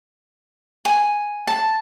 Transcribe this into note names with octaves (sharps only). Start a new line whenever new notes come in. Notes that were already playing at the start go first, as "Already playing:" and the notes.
G#5
A5